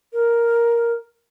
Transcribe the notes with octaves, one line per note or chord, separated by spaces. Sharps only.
A#4